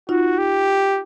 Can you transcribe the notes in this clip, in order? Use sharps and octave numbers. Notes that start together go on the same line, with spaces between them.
D#4 F4 F#4
G4